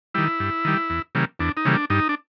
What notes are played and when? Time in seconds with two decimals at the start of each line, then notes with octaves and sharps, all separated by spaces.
0.14 D#3 G3 E4
0.40 G2
0.65 D#3 G3
0.90 E2
1.15 C#3 E3 G3 A#3
1.39 E2 D4
1.57 D#4
1.65 C#3 E3 G3 A#3
1.74 D4
1.90 G2 D#4
2.09 D4